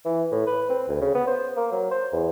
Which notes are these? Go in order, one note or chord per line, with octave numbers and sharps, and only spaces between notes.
E3
A2
B4
C4
D2
C#3
B3
C5
A#3
F#3
C5
E2